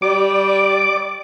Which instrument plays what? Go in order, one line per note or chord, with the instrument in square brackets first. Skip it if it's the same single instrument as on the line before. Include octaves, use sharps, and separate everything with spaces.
[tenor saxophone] G3 [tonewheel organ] D5 D6